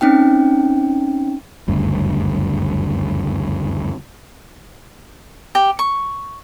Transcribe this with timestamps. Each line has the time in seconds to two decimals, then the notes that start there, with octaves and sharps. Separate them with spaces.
0.01 C4 C#4 D#4 G5
1.68 F#1 D2 G2
5.55 G4
5.79 C#6